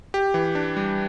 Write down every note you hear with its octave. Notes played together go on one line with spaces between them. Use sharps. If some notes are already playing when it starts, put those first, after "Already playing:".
G4
E3
D4
G3